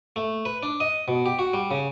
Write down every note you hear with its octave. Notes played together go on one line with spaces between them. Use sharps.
A3
B4
D4
D#5
B2
G4
F#4
G3
C#3